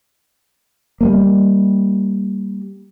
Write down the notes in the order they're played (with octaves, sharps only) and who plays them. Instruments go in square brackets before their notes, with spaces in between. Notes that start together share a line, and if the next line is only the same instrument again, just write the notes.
[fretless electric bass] G3 A3 A#3